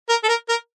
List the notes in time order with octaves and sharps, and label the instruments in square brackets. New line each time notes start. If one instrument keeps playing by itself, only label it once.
[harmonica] A#4
A4
A#4
A#4